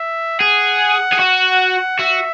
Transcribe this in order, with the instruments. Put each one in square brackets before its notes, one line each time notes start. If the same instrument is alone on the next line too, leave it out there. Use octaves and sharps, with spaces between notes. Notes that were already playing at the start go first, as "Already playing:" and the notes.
Already playing: [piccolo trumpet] E5
[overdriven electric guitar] G#4 [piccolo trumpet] F#5
[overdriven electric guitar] G#4
F#4
[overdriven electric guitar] F#4 [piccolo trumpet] E5